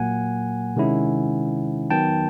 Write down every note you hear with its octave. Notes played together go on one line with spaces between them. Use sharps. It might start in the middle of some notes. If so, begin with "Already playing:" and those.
Already playing: A#2 F#3 A#3 F#5 G#5
C3 D#3 G#3 C#4 E4
D#3 F#3 B3 G5 A5